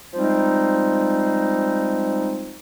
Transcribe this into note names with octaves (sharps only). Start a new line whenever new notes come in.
F3 G3 G#3 C4 D#4